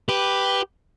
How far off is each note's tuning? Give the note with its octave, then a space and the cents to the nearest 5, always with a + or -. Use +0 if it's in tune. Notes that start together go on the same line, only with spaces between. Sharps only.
G4 +0 B4 +0